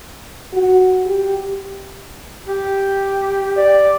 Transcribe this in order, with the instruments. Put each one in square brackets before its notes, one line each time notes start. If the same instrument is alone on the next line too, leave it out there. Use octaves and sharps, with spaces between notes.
[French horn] F#4
G4
[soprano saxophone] G4
[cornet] D5